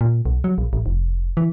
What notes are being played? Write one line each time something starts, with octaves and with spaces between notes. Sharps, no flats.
A#2
B1
F#3
A#1
A1
F1
E3